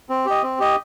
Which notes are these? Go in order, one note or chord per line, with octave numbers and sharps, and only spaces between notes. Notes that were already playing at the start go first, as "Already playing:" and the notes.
C4
G4 D#5
C4
G4 D#5